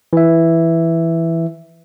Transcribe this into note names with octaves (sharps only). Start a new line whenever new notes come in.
E3 E5